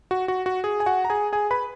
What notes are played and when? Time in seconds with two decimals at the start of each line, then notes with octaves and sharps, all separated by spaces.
0.11 F#4
0.28 F#4
0.46 F#4
0.64 G#4
0.80 G#5
0.86 F#4 F#5
1.05 A#5
1.10 G#4 G#5
1.33 G#4 G#5
1.51 B4 B5